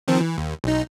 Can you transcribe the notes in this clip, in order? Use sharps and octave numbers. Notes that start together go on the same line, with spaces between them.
D#3 F3 C4
E3
D#2
B1 D#4